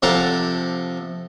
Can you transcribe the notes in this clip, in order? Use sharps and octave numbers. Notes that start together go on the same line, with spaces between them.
C3 F3 A4 F#5 A#5 D6